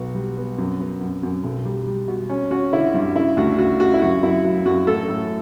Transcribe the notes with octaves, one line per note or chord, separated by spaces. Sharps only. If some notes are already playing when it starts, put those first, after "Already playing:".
Already playing: B1 B3 F#4
G3
B3
F#2
B3
F#2
F#2
B1
G3
G3
B2
C#4
C#4 F#4
D3 E4
G2
C#3 E4
D2 F#4
C#3 F#4
C#3 F#4
E4
F#2 F#4
F#2 E4
F#3
F#2 F#4
A1 A4
A2